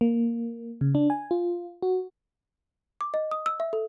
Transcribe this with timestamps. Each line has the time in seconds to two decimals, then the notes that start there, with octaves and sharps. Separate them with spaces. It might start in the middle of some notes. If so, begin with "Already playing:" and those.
0.01 A#3
0.81 C#3
0.95 D4
1.10 G#5
1.31 F4
1.82 F#4
3.01 D6
3.14 D#5
3.31 D#6
3.46 E6
3.60 E5
3.73 A4